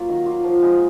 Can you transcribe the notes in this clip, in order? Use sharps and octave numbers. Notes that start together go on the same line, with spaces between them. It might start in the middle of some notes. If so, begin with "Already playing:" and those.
Already playing: F#3 A#3 F4
D#3
F#3 A#3 F4
F3
G#3 D#4 A#4